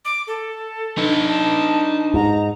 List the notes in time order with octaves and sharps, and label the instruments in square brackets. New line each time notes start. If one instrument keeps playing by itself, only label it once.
[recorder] D6
A4
[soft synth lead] D4 [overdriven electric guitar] D#4 B4
[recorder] A5
[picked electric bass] G#2 [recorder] A#5